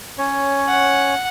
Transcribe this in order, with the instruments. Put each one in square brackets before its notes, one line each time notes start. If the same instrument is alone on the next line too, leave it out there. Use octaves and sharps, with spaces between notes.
[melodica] C#4 C#5
[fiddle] F#5